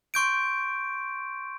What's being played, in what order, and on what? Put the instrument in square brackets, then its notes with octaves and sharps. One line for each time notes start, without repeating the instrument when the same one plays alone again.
[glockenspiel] C6 C#6 G6 D7